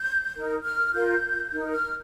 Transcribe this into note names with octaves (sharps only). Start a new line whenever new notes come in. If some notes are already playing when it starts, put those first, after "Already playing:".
Already playing: G6
D#4 A#4
F6
F4 A#4 G6
D#4 A#4
F6